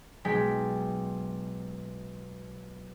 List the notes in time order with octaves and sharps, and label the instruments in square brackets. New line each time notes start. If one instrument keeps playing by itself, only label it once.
[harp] B1 G#3 G5 B6